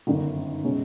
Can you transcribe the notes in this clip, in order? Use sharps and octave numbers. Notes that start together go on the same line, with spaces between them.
G1 F#2 D#3
B2 G#3 C#4